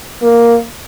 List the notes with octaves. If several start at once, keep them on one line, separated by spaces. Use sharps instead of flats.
A#3